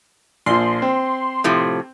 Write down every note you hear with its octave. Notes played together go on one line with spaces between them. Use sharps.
A#1 F3 C6
C4
A2 C3 F3